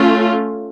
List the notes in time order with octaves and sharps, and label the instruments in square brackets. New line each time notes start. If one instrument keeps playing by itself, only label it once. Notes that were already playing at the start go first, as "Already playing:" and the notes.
Already playing: [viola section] A3 C#4 F4